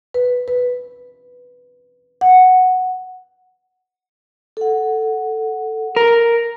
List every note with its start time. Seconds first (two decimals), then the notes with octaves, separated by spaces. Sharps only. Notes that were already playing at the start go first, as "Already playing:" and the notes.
0.14 B4
0.48 B4
2.21 F#5
4.57 A4 F#5
5.96 A#4